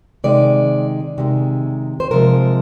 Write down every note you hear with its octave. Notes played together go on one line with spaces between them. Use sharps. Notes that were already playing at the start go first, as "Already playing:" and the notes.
C3 D#3 G#3 D5
C3 D#3 G#3
C5
C3 F3 G#3 A#4